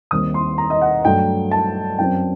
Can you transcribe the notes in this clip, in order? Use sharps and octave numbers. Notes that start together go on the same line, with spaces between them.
D#2 D#3 G3 C4 D#6
C6
A#5
D#5
F#5
G2 F#3 A3 G5
A5
F#2 F#3 C4 G5